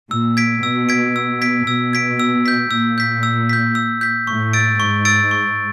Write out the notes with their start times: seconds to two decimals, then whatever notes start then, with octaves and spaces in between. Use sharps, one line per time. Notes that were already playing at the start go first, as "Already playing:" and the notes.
0.11 A#2 E6
0.37 G#6 B6 D7
0.63 B2 E6
0.89 G#6 B6 D7
1.16 E6
1.41 G#6 B6 D7
1.67 B2 E6
1.93 G#6 B6 D7
2.20 E6
2.46 G6 B6
2.71 A#2 E6
2.98 G6 B6
3.23 E6
3.49 G6 B6
3.75 E6
4.01 G6 B6
4.27 A2 C#6
4.53 E6 A6 D7
4.80 G#2 C#6
5.05 E6 A6 D7
5.31 C#6